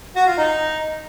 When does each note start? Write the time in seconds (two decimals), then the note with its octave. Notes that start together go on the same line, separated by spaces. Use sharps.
0.16 F#4
0.27 F4
0.38 D#4